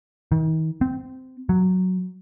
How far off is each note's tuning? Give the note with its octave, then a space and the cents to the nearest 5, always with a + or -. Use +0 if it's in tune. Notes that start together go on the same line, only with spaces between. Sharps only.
D#3 +40
C4 -15
F#3 +0